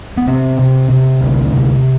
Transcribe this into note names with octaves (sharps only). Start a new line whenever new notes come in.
B3
C3 C4
C3
C3
D2
C3